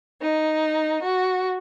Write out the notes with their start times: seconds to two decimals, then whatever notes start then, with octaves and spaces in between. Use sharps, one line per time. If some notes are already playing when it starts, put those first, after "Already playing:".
0.20 D#4
1.02 F#4